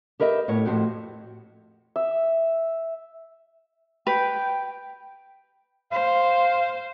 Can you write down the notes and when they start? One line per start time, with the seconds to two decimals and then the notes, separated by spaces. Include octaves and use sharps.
0.20 G4 A#4 B4 D#5 E5
0.48 A2 B3 C#5
0.65 F2 A2 C4 F#4 G4
1.96 E5
4.07 B4 G5
5.91 C5 F5